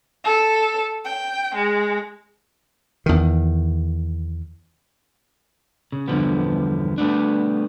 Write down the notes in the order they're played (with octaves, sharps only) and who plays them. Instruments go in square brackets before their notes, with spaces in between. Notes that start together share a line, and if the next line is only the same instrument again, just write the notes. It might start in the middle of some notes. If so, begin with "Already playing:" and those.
[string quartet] A4
G5
G#3
[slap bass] E2 D#3
[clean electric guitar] C#3
E2 G2 D3 F3 B3
G3 A3 B3 D4